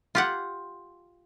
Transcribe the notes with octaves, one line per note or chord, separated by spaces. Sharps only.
F4 G4 F#5